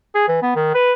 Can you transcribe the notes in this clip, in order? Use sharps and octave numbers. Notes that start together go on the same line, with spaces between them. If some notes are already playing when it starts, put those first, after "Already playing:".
G#4
E3
B3
D#3
B4